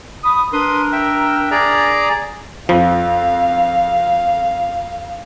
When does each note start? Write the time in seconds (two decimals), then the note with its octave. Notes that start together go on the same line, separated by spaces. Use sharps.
0.24 B5 D#6
0.53 D4 A#4 B4 C6 D#6
0.92 E5 G5
1.51 G#4 D5 A#5
2.69 F2 F3 F5